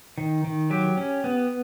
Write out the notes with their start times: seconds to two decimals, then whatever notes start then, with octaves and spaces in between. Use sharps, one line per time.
0.18 D#3
0.44 D#3
0.70 F#3 G4
0.97 C#4
1.24 B3